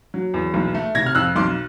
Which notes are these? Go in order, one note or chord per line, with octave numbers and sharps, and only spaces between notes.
F#3
E2
B1
A3
C3 G#6 A#6
F6
F2 E6 F#6
B1 C6 D6